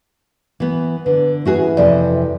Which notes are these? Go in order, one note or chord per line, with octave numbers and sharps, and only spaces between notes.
E3 B3
D3 B4
E3 C#4 F#4 G#4
F2 C3 A4 D5